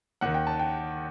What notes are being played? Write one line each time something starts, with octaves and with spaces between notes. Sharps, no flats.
D#2 D#3 F#5
G5
A5
G5